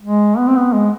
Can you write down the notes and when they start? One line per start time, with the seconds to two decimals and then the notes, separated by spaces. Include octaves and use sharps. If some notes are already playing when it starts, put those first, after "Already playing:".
0.02 G#3
0.37 B3
0.47 C4
0.56 B3
0.73 G#3